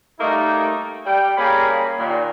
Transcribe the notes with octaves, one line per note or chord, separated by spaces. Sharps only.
G3 A3 A#3 D#4
G3 G5
G3 A#3 C#4 G#4 G#5 B5
A#2 D#3